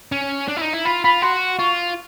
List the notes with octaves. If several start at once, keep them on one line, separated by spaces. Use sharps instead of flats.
C#4
D4
E4
D#4
E4
F4 B5
F4 B5
F#4 C6
F4 C#6